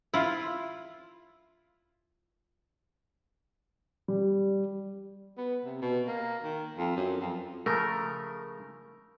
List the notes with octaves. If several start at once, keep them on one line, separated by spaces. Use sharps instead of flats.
E4 F4
G3
B3
C3
B2
A#3
D#3
F2
F#2
F2
C#3 F3 A3 A#4